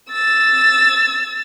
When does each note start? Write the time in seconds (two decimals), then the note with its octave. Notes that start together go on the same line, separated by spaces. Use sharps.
0.11 E6 A6